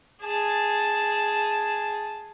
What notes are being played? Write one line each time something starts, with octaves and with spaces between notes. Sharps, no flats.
G#4 A5